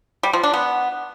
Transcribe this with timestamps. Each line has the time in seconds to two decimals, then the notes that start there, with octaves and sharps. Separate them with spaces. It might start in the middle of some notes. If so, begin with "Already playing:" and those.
0.23 G3
0.33 F3
0.43 D4
0.53 B3